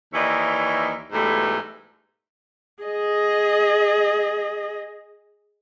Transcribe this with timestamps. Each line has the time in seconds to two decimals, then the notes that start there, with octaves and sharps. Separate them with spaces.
0.13 D#2 E3 D#4 C#5 D5 E5
1.13 G#2 B2 E3 G3 A3
2.83 G#4 D#5